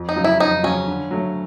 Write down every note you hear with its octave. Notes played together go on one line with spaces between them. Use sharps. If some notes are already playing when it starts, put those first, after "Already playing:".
Already playing: F2
D#4
C#3 F#3
E4
F2 D#4
C#3 F#3 C#4
D3
F#3 A3